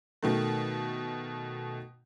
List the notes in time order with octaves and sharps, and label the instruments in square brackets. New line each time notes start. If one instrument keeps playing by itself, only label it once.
[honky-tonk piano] B2 D#3 A3